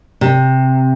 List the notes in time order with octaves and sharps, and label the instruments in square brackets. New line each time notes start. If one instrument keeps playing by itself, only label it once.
[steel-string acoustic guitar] C3